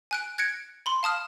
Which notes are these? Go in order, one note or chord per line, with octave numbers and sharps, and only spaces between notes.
G#5 F#6 D7
F#6 G#6 A#6 C#7 D7
B5 C6
F5 A5 D#6 F6